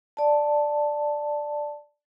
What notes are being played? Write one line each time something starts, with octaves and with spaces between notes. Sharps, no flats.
D5 A5